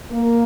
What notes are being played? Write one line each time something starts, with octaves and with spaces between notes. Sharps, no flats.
A#3